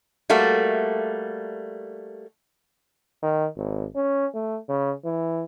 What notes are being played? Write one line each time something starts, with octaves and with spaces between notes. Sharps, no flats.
G3 A3 A#3 F#4
D#3
G#1
C#4
A3
C#3
E3